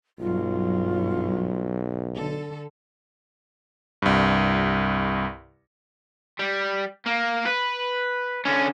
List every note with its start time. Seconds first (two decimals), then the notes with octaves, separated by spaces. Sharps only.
0.19 B1 G2 F#3 F4
2.15 D3 A4
4.02 C2 G2
6.39 G3
7.06 A#3
7.46 B4
8.45 D3 C#4